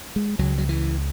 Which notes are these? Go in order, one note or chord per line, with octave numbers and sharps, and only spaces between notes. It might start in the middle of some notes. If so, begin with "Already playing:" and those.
G#3
C#2 C#3 F#3
F#3
E3